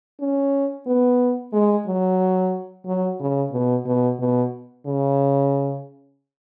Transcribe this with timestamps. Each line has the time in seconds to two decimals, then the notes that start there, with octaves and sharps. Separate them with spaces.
0.20 C#4
0.87 B3
1.53 G#3
1.87 F#3
2.86 F#3
3.20 C#3
3.52 B2
3.86 B2
4.19 B2
4.86 C#3